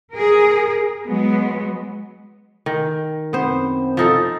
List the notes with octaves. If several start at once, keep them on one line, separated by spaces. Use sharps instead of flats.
G#4 A#4
F#3 G#3 B3
D#3
F#2 B3 C4 C5
F3 D#4 A4